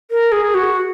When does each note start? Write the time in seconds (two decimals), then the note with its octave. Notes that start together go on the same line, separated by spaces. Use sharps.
0.11 A#4
0.32 G#4
0.54 F#4